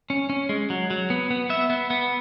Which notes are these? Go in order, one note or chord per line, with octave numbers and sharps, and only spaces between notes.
C#4
C#4
G#3
F#3
F#3
B3
B3
B3 E5
B3
B3